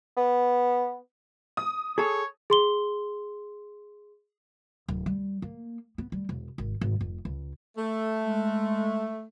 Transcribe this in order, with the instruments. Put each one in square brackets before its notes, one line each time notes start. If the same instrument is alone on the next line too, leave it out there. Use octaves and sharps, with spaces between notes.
[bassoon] B3
[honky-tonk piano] D#6
[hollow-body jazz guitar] G#4 A4 [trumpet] C#5
[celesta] G#4 C6 G7
[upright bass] D1
G3
A#3
B3
G3
E1
G#1
G#1
F1
C#2
[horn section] A3
[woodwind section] G#3